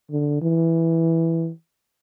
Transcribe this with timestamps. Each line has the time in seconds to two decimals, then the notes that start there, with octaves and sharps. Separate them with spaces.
0.11 D3
0.41 E3